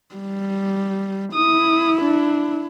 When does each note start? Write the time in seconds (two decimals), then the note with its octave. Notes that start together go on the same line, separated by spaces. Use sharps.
0.15 G3
1.35 E4 D#6
2.01 D4